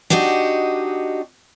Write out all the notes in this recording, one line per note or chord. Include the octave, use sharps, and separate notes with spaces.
D4 D#4 F#4 G4 D#5